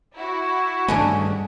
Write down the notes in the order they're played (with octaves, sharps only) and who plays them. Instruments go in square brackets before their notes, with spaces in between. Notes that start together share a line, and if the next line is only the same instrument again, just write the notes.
[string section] E4 F#4
[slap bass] G2 D#3 A3 [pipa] G#3 C#4 D4